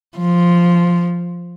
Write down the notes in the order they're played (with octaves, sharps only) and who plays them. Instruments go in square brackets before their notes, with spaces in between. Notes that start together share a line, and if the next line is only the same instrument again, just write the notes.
[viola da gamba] F3